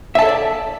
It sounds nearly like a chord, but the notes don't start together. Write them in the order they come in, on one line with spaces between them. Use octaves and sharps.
E5 A5 A4 C#5 D5